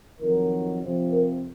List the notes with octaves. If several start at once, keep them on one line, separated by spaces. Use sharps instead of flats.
F2 D#3 F#3 A#4
F2 C3 F3
A#4